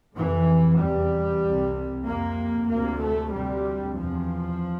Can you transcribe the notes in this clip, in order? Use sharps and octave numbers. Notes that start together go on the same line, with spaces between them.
F2 C3 E3
E2 C3 G3
C2 C3
F2 C3 A#3
D2 A#3
C3
A3
D2 C3 G3
E2 C3 F3